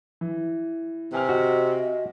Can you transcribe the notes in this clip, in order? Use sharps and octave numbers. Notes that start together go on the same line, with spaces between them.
E3
C3 B4 G#5 F6
F#4 D#5